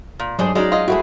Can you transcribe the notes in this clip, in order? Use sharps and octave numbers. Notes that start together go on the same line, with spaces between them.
A#2
G2 F#3 G#3 D4 G#4 C5
G#3 C#4 D#4 F#4 D5
F4 D#5
G#3 A3 C4 E4 F#4 G#4